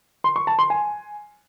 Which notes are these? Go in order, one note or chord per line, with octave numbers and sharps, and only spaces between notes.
C6
C#6
A5
C6
G#5